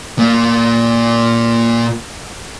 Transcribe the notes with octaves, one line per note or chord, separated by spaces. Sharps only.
A#2 A#3